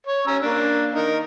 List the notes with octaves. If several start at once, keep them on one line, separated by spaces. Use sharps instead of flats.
C#5
C#4 A#5 E6
A#3 D4
D#4 A#4